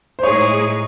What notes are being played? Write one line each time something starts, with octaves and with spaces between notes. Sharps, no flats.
C5
A2 G#3 D#4 G#4 C#5